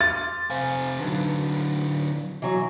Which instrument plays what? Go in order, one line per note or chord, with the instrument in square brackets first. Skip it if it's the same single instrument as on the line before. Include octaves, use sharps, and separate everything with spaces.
[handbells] C6 D6 F6 [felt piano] A6
[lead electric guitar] C3 G#5 [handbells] C5 F5 F6
[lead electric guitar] D3 F#3 [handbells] D#4 B4 A5
[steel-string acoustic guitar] E3 F#3